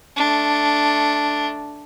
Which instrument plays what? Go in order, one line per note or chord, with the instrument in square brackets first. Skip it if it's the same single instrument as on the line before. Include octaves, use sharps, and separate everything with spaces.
[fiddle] A3 D4